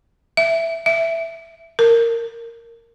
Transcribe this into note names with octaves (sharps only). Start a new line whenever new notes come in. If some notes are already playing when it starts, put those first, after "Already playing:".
E5
E5
A#4